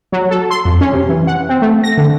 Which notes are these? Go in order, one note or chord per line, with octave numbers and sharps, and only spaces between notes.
F#3
A4
C6
F2
C#4
C3
E3
F#5
C4
A3
A#6
D3